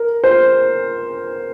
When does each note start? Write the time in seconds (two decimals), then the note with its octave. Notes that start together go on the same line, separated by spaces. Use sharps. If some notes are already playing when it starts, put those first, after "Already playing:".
Already playing: A#4
0.24 C5